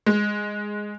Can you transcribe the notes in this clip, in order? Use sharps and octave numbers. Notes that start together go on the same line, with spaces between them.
G#3